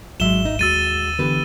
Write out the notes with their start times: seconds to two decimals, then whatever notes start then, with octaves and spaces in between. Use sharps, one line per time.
0.20 G#1 G#2 F#3 G#3 E5 E7 G7
0.45 D#4
0.59 D#2 G#3 F#4 E6 A6 D#7
1.19 D3 E3 B3 G4 B4